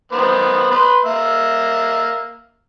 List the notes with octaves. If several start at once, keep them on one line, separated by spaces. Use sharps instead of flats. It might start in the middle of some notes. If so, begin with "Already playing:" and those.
D#3 B3 C5
B4 C6
A#3 E5